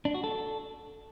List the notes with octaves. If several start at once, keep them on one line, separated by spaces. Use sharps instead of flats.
D4
F#4
A4